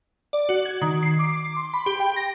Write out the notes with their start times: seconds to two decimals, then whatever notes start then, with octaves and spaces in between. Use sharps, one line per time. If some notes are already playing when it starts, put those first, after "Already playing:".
0.33 D5
0.49 F#4
0.65 G#6
0.82 D#3
1.03 C7
1.19 D6
1.57 C6
1.74 B5
1.86 G4
2.00 G5
2.16 A#6